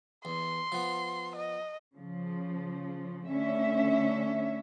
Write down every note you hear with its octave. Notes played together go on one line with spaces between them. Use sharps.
E2 C6
F3 B3
D#5
C#3 F3
D2 D3 C#4 E5